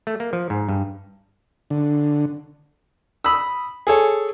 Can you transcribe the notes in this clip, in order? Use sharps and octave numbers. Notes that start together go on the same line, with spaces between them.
A3
A#3
F3
G#2
G2
D3
B5 D#6 E6
G#4 A4 C#5